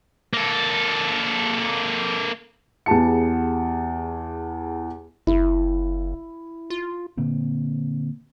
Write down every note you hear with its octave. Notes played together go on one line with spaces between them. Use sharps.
A#3 A4
E2 B3 G4 G#4 A5 C#7
F#1 E4
F4
A#2 D3 A#3 C4